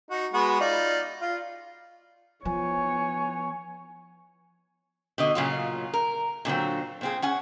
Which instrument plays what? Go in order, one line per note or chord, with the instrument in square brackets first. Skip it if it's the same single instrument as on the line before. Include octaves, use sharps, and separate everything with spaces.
[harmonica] D#4 F#4
G#3 B3 F#4
D#4 F4 D5
F4
[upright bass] F3 [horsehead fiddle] B3 C#5 [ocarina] G#5
[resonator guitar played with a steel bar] B2 D3 D#5
A#2 C#3 F#3 F4
A#4
A#2 D3 F#3 C4
A#2 C4 G#4
C#4 F#5 G#5